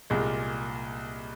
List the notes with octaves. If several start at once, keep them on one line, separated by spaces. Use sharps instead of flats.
C2 A#2 G#3